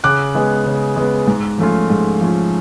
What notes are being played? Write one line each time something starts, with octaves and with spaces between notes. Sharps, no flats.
C#3 D6 F#6
G#3 B3
C#3
G#3 B3
G#2
F3 A3 C#4 F4
G#2
F3 A3 C#4 F4